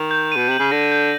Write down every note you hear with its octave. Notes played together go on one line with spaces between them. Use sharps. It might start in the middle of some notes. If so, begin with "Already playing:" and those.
Already playing: D#3
G6
B2 D#7
C3 F#7
C#3
D3 A#6
G6